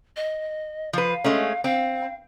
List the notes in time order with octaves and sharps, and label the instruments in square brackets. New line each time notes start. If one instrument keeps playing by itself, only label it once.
[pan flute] D#5
[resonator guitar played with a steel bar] F3 B4 [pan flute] F5
[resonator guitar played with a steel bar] G#3 A3 C#4
[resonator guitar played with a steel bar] C4 [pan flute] F5